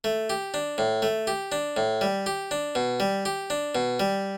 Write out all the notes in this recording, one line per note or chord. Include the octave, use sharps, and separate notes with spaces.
A3
G4
D4
A2
A3
G4
D4
A2
G3
G4
D4
B2
G3
G4
D4
B2
G3